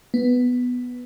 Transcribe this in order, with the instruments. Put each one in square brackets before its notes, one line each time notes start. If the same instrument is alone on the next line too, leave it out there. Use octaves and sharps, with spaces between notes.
[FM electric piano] B3